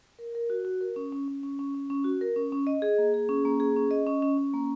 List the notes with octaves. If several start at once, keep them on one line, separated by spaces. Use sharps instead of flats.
A#4
A#4
F#4
F#4
A#4
C#4
C#4
C#4
C#4
C#4
C#4
C#4
F#4
A#4
C#4
C#4
D#5
G#4
A#3
G#4
C#4
A#3
G#4
C#4
D#5
C#4
C#4
C#4
A#3